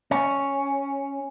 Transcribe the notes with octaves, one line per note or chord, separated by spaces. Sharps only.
C#4